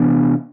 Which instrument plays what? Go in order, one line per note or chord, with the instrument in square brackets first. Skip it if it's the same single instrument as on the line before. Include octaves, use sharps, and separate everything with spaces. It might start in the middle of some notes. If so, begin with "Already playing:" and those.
Already playing: [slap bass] C3 E3 B3 D4